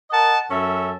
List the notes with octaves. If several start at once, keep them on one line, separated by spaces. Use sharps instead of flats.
A#4 D#5 F#5 A5
F#2 C#4 A4 E5